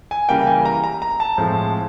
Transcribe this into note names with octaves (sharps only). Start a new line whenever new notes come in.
G#5
C#3 E3 G3 A#3 G5
G#5
A#5
A#5
A#5
A5
A2 F3 G#3 C4